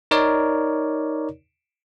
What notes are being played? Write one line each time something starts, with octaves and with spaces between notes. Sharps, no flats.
D#4 A#4 C#5 D5